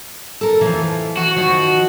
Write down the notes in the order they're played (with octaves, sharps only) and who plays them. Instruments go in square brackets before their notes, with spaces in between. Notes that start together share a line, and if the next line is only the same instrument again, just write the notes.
[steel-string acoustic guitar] A4 A#4
E3 F3
[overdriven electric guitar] F#4
[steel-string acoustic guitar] D#3 F3